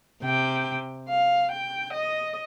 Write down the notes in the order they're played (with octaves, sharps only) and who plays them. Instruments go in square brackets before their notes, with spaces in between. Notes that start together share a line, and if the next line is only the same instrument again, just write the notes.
[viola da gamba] C3 [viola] G5
[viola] F5
G5
D#5